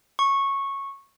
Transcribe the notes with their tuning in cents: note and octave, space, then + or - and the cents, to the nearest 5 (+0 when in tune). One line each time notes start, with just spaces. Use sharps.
C#6 -10